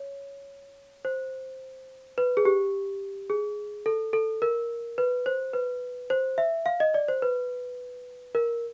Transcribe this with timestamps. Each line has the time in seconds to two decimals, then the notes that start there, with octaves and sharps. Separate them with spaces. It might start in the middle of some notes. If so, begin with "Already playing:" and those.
Already playing: C#5
1.05 C5
2.18 B4
2.37 G#4
2.45 G4
3.30 G#4
3.86 A4
4.13 A4
4.42 A#4
4.98 B4
5.26 C5
5.54 B4
6.10 C5
6.38 E5
6.66 F5
6.80 D#5
6.94 D5
7.08 C5
7.22 B4
8.35 A#4